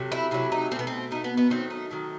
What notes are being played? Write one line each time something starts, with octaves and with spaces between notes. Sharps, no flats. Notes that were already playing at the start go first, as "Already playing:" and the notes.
Already playing: C3 F#3 A3
E4
C3 F#3 A3 E4
D#4
B2 A3 B3 C4
C4
B2 A3 D#4
B3
B3
D#3 F#3 A3 C4
D#4
D#3 F#3 A3